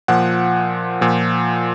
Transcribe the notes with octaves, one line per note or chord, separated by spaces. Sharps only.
A#2 F3 F#5
A#2 F3